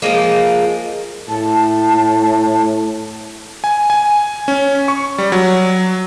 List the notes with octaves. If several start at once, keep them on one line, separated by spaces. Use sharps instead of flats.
F3 F#3 G#3 A#3
A2 A5
G#5
G#5
C#4
C#6
G3
F#3